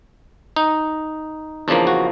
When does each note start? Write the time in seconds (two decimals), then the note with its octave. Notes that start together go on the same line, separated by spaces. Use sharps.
0.56 D#4
1.68 E2 C#3 F3 A#3 D4
1.87 F#4